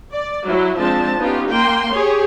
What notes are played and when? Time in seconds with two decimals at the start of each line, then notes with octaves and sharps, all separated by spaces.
0.13 D5
0.46 F#3 E4
0.78 F3 G#3 C4 D4 A5
1.18 B3 C#4 D#4 F4 G4
1.50 A#3 G5 C6
1.93 G4 G#4 C#5